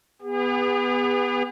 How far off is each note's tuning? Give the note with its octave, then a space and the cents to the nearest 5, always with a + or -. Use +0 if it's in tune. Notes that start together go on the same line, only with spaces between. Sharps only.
B3 +0 G#4 -45